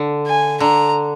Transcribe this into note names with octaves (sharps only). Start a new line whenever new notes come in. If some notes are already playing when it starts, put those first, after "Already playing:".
Already playing: D3
G#5
D3 A#5